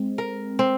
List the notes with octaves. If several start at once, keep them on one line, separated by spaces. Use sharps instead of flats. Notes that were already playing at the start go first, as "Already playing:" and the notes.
Already playing: G#3 C4
A#4
C4